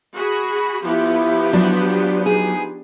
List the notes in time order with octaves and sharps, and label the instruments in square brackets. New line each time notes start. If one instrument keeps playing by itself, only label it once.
[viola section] F#4 G#4 B5
[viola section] F3 B3 G4 [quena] E4
[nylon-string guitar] F#3 [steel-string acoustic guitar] D4
[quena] D#4 [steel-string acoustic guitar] G#4